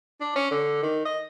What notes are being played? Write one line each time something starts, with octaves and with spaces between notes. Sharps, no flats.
D4
C#4
D3
D#3
D#5